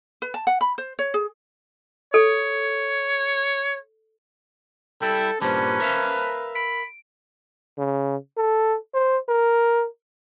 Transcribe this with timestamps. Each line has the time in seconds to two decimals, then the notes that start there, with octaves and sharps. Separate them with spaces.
0.22 B4
0.34 A5
0.47 F#5
0.61 B5
0.78 C5
0.99 C#5
1.14 G#4
2.14 A4 C#5
5.02 G3 E4 A4 G5
5.41 G2 A#2 G3 C#4 B4 C5 A5
5.80 A#4 E5 F5
6.55 B5 D7
7.78 C#3
8.37 A4
8.94 C5
9.29 A#4